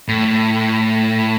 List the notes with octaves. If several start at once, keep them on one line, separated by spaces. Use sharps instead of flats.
A2